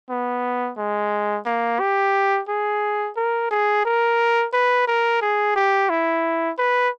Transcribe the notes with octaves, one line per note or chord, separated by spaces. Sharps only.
B3
G#3
A#3
G4
G#4
A#4
G#4
A#4
B4
A#4
G#4
G4
E4
B4